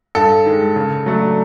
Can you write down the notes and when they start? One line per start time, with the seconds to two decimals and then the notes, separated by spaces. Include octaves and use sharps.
0.15 G2 A4
0.46 D#3 G#3
0.76 C#3
1.06 F#3 A3 D4